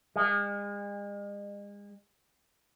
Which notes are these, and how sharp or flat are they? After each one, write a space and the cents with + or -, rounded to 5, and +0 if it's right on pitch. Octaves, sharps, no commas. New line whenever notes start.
G#3 -40